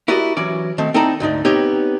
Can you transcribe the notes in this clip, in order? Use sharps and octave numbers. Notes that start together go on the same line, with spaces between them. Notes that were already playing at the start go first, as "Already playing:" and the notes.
E4 F#4 G4 A#4 D5 D#5
E3 F#3 C#4 D5
D#3 A3 C4
C4 D#4 E4 A4 D5 A#5
D2 G#2 D#4 D5
B3 C4 D#4 G4 C#5